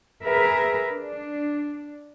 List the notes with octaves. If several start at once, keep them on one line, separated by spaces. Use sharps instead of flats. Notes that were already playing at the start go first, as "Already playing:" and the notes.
G#4 A#4 B4 E5
D4